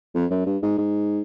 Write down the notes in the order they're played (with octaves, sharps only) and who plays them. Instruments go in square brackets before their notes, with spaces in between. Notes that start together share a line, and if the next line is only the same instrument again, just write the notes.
[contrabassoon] F2
F#2
G2
G#2
G#2